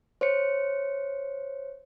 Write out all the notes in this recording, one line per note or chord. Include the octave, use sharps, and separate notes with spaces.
C5 C#5 C#7